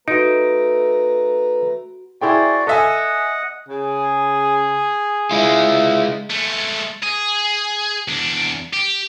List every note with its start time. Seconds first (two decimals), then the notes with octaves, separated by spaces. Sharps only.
0.08 A3 D#4 F#4 B4 A#5 D7
2.21 E4 F#4 G#4 C5 D5 G5
2.67 A4 D#5 E5 F#5 G#5
3.69 C#3 G#4
5.31 G#3 E4 F4
6.30 G#3 A3
7.03 G#4
8.08 E2 D4
8.73 G4